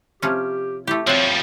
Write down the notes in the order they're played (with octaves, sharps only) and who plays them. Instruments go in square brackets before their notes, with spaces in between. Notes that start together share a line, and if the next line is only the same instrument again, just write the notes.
[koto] C3 F3 C#4 [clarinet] G4
[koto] A3 G4 [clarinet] E4
[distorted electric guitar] F3 G3 [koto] C4 F#4 [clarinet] C#5